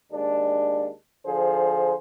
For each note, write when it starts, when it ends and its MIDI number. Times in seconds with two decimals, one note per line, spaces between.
0.12 0.89 39
0.12 0.89 56
0.12 0.89 62
1.26 1.94 50
1.26 1.94 53
1.26 1.94 68
1.26 1.94 72